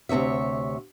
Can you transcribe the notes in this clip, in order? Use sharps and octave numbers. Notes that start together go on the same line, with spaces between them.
D2 C3 D#3 C#5 E5